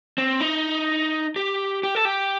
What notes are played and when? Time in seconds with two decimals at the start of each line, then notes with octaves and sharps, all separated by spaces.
0.18 C4
0.41 D#4
1.36 G4
1.83 G4
1.95 A4
2.05 G4